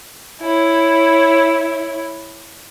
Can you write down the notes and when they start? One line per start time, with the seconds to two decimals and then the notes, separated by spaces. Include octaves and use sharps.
0.41 E4 C#5